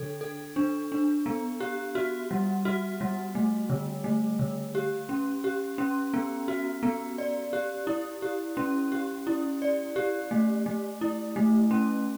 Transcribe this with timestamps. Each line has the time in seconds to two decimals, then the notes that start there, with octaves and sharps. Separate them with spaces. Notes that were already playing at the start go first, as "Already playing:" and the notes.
Already playing: D3 D4 A4
0.21 A4
0.56 D4
0.92 D4
1.26 B3
1.60 G4
1.95 F#4
2.31 G3
2.65 F#4
3.01 G3
3.35 A3
3.70 D3
4.04 A3
4.39 D3
4.75 G4
5.09 C#4
5.44 G4
5.78 C#4
6.14 B3
6.48 F#4
6.83 B3
7.18 D5
7.53 G4
7.87 E4
8.22 G4
8.57 C#4
8.92 G4
9.27 E4
9.62 D5
9.96 G4
10.31 A3
10.66 A3
11.01 E4
11.36 A3
11.71 C#4